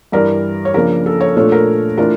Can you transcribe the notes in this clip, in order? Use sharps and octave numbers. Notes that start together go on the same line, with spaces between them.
G2 E3 G3 A#4 D5
C#5
C#3 F3 A#3 D4 A#4
A4
A4 C#5
A#2 A3 D4 F4 A4 C#5
A#4
E3 A3 D4 F4 A#4